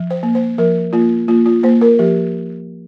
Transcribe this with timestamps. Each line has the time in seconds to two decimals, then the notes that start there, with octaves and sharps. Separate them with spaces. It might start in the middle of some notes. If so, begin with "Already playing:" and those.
Already playing: F3
0.11 C5
0.23 A#3
0.35 C5
0.58 F3 A#4
0.93 A#3 F4
1.28 A#3 F4
1.46 F4
1.63 A#3 C5
1.81 A#4
1.99 F3 G4